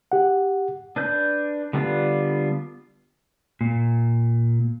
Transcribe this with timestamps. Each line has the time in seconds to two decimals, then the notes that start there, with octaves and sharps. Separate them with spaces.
0.12 G4 F#5
0.96 D4 B4 G6
1.73 D3 G3 B3 D4 F4
3.61 A#2